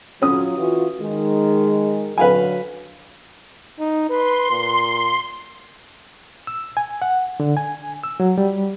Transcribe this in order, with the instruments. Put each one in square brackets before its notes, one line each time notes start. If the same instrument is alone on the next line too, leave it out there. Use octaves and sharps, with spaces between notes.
[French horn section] F#3 F4 [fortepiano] C#4 D#6
[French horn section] E3 F4 F#4
D#3 G#3
[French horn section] D3 F#3 [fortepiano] B4 F5 G#5
[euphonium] D#4
[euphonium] B4 [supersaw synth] C6
[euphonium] A#2
[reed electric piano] E6
G#5
F#5
D3
G#5
E6
F#3
G3